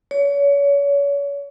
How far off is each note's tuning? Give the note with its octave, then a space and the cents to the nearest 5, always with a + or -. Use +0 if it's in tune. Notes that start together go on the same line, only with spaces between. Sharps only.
C#5 +35